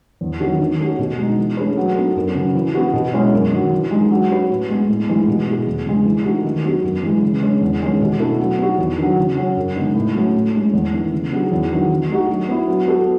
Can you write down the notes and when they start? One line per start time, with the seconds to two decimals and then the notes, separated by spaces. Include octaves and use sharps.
0.21 E2
0.40 D#3 F#3 C#4 F#4
0.60 D#3
0.79 A3 C#4 F#4
0.99 B2
1.18 G#3 D#4
1.38 E3
1.57 A3 C#4 G#4 B4
1.77 F#3
1.96 B3 D#4 A4
2.16 F#2
2.35 C#3 F#3 C#4
2.55 E3
2.74 B3 F#4
2.93 B2
3.13 G#3 C#4 E4
3.33 F#2
3.52 D#3 F#3
3.71 E3
3.91 G#3 D#4
4.11 F#3
4.30 C#4 F#4 B4
4.50 A2
4.70 G#3 B3
4.89 A2
5.08 E3 G#3 D#4
5.28 B2
5.48 A3 E4 G#4
5.67 E2
5.86 C#3 G#3
6.05 E3
6.25 A3 D#4 F#4
6.45 D#3
6.64 F#3 B3 F#4
6.83 F#2
7.03 E3 G#3
7.23 C#3
7.42 G#3 C#4
7.61 E2
7.82 D#3 G#3 C#4
8.01 B2
8.19 A3 E4 A4
8.40 F#3
8.59 B3 D#4 F#4
8.79 E2
8.97 D#3
9.03 F#3
9.17 C#3
9.37 F#3 C#4
9.57 F#2
9.76 C#3 G#3 B3 D#4
9.96 A2
10.14 F#3 A3 C#4
10.34 A2
10.53 G#3 C#4 E4
10.73 E2
10.93 D#3 A3 E4
11.13 C#3
11.32 F#3 B3 D#4 G#4
11.52 E2
11.71 D#3 F#3
11.90 D#3
12.10 A3 D#4 F#4
12.29 F#3
12.49 B3 E4
12.68 F#3
12.87 B3 F#4 A4